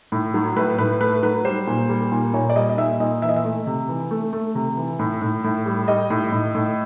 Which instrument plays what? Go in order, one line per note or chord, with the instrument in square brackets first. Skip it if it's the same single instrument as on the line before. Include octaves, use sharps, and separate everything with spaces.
[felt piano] A2
F#3
A2 B4
A2 B4
A3 B4
F#3 B4
G3 C5
A#2
G3
A#2
A#2 C#5
D5
G3 D#5
D#5
A#2 E5
A#2 D#5
E3 E5
D#5
E5
A3
C3
E3
A3
A3
C3
E3
A2
A2
A2
G3
G3 D#5
A2
A2
A2